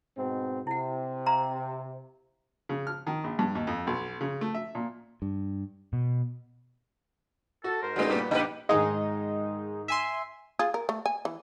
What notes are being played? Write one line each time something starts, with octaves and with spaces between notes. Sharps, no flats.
G#2 B2 C4
C3 E4 F#5
F5 A#5 C6
C#3
F6
D#3
A#1
G2
D#2
F2
B1
C#3
A3
E5
A#2
G2
B2
F#4 A4
G#2 A#4 C5
G2 F#3 G#3 A3 D#4
A#2 G3 B3
A#1 D3 D#4 G4 B4
G#2 D#3 G#3 D#4 D#5
E5 G#5 C6
F4 G#4
A#4
A3
G#5
E3